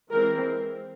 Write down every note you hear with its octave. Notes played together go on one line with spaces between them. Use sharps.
E3 G#3 C4 A#4